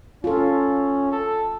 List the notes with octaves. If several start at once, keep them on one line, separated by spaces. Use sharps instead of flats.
C#4 F4 A4
A4